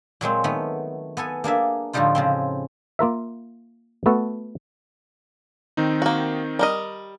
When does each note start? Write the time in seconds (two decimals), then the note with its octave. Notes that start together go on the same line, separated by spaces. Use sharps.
0.21 A#2 F#3 G#3 C4
0.44 D#3 A3 B3
1.17 B3 A4 G#5
1.44 A#3 D4 G#4 E5
1.93 A2 D3 F3 G3 D#4 F4
2.15 C#3 F3 C4
2.99 A#3 F4 A#4 E5
4.06 A3 B3 F#4 A4
5.77 D#3 C4 D#4
6.02 A#3 F#4
6.59 G3 A#4 D#5